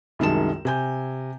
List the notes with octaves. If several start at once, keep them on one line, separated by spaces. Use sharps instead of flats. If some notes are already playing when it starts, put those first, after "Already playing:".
C2 F#2 D#3 G#3 A5 E7
C3 G#5 G6